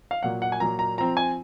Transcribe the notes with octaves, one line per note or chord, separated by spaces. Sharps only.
F5
A#2 F#3 A#3 F#5
F#5
G#5
A#2 F#3 A#3 A#5
A#5
F3 C4 A#5
G#5